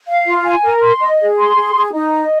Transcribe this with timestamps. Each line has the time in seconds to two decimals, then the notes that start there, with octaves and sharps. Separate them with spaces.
0.08 F5
0.27 F4
0.44 G#5
0.64 A#4
0.82 C6
1.01 D#5
1.19 G#4
1.38 C6
1.56 G#4
1.74 G#4
1.93 D#4
2.12 D#5